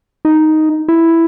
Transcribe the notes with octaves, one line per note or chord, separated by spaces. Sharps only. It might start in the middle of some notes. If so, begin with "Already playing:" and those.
D#4
E4